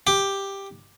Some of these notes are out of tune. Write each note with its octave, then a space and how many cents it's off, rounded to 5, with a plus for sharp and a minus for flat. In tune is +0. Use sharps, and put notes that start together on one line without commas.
G4 +5